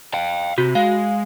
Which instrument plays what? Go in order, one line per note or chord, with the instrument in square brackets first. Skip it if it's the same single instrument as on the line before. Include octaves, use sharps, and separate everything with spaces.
[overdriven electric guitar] F5 G5
[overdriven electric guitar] C3 [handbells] F#4
[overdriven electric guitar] G#3 [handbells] F5